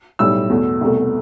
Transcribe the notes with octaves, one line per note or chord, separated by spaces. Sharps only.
B1 A2 G3 E6
E2 B2 A3
C2 B2 A3